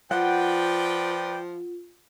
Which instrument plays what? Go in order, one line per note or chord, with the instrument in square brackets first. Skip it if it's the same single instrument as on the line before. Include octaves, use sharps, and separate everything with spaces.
[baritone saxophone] F3 [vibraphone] F4 [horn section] B4 D5 G5 [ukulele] F#5